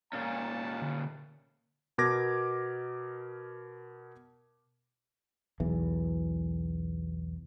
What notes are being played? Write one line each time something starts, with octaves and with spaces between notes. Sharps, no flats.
A#2 C#4 F5 G5 A5
D3
B2 A#4 D6 G#6 A#6
B1 E2 E3